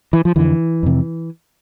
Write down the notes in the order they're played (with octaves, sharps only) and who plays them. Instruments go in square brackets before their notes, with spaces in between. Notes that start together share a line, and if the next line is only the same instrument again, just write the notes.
[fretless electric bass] E3
F3
F2 D3 E3
F2 C3